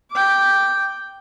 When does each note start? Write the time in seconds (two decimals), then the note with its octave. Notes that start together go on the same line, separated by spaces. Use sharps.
0.11 G5 D6